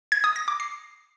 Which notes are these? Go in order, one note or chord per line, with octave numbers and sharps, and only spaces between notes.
G#6
D#6
A#6
D6
C7